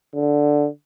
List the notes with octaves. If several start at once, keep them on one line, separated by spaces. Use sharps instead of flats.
D3